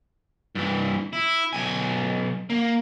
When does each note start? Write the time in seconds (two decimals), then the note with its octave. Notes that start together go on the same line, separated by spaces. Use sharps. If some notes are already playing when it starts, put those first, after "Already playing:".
0.55 G2 E3
1.13 E4
1.53 B1 G#5
2.50 A#3